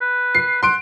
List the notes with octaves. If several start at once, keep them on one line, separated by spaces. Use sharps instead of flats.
B4
C7
F#5 C6 D7